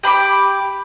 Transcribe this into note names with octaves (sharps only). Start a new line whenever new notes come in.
G4 B5 C6 D6